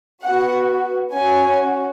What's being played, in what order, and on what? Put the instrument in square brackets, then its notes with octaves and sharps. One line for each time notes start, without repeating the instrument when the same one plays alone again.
[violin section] B3 F#4 F#5
C#4 F#4 G#5